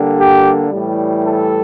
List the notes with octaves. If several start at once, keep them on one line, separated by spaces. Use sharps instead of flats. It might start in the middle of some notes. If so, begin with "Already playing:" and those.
Already playing: D3 G3 A#3
G4
A2 E3 G3
A4